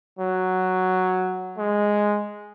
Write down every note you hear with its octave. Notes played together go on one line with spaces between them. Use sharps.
F#3
G#3